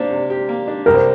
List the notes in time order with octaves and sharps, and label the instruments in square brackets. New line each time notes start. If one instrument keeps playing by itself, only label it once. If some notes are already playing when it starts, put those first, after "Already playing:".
Already playing: [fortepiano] C3 A#3 D4 G4 [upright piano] C5 D5
[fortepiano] C3
G4
A#3
D4
[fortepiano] C2 [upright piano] A#4
[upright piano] C5